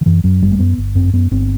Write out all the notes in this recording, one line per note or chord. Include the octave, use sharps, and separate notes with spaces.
D#3
F#2 E3
F#2 F#3
G1 G3
A3
F#2 B3
G1
F#2 C4
F#2 B3
G1 C4